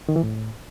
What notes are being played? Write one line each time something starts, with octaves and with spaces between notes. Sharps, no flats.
D#3
E3
A2